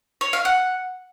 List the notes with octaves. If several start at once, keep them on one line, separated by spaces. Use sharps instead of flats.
C#5
F5
F#5